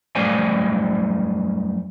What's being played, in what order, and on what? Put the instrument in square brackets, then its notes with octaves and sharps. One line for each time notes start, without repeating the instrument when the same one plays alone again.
[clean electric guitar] F#2 G3 A3 C5 D5 G#5